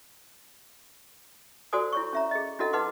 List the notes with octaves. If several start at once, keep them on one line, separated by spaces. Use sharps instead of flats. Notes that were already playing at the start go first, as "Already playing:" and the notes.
F#4 A4 C5 D5 G#5 D#6
E4 C#5 C#6
C#4 E5 A#5
G#4 D#5
D4 E4 F#4 A4 D#5 F#5
D#4 B4 F#5 C6 D6